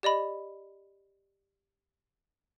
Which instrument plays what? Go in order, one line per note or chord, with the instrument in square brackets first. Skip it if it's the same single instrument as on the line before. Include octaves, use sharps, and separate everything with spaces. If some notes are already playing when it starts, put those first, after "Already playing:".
[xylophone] G4 D5 D#5 B5